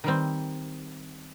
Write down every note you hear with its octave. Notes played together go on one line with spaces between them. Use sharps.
D#3 G3 C4